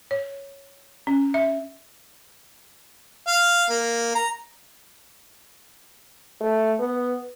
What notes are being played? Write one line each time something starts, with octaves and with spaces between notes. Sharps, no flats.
C#5
C#4
E5
F5
A#3
A#5
A3
B3